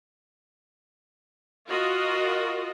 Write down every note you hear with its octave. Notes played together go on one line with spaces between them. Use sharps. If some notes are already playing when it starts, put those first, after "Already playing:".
F4 F#4 A#4 D#5